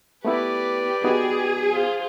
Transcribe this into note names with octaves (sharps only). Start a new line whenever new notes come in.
A3 B3 E4 G4 B4 D5
B3 D#4 F#4 G#4
F4 C5